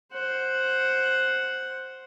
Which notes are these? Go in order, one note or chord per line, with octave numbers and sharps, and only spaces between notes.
C5 F#5